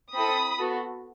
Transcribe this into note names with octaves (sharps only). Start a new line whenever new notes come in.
C4 E4 A4 B5 D#6
B3 F#4 A4